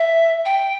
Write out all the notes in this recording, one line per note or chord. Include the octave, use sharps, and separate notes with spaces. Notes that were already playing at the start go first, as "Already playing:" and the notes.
Already playing: E5
G5